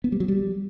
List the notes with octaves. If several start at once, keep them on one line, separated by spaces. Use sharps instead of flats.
B3
G3
F#3
G3